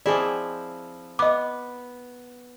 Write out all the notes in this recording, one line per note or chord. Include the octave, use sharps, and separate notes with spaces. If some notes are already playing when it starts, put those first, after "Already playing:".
F3 C4 E4 G#4 D5
B3 D#5 D6